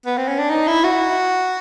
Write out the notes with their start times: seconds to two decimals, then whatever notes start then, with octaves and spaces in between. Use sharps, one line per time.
0.06 B3
0.17 C4
0.28 C#4
0.39 D4
0.50 D#4
0.67 E4
0.84 F#4